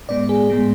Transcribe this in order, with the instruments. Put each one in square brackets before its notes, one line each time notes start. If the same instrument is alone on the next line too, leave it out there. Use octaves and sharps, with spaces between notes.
[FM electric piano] A2 G#3 B3 D5
G#4
A2 G#3 B3